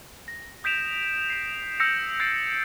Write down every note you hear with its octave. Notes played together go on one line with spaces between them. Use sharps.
A#6
D#6 G6 B6 D7 E7 F7
C7 E7
E6 G6 A#6 C#7
G6 A6 C7 D7